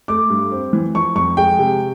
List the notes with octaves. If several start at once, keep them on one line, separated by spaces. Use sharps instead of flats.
A3 D6
G2
C4
E3
F3 C#6
F2 C#6
G#3 G5
C3